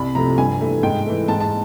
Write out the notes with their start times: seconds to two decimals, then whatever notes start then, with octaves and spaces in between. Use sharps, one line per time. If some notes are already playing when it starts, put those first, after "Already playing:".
Already playing: C2 B5
0.15 C3 F3 A3 A#5
0.38 G2 G#5
0.61 E3 A3
0.83 G#2 G5
1.06 E3 A3
1.28 G#2 A5
1.40 A5